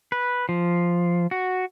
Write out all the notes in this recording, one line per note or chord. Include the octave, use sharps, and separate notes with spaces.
B4
F3
F#4